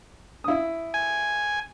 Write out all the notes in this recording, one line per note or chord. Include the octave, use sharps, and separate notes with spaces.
E4 D#6
G#5